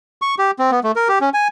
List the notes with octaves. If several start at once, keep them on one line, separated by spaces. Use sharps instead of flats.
C#6
G4
C4
B3
A3
A#4
G4
C#4
G#5